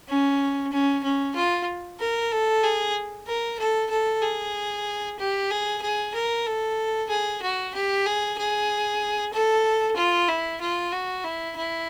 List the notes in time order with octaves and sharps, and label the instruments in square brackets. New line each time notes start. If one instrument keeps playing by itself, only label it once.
[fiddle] C#4
C#4
C#4
F4
A#4
A4
G#4
A#4
A4
A4
G#4
G4
G#4
G#4
A#4
A4
G#4
F#4
G4
G#4
G#4
A4
F4
E4
F4
F#4
E4
E4